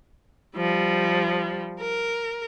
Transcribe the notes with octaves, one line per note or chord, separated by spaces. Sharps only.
F3 G3
A#4